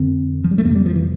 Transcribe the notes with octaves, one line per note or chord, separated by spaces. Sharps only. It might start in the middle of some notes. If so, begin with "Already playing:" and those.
Already playing: F2 D3 C4
F3
G3
A3
F2 C3 A#3
G3
F3
E3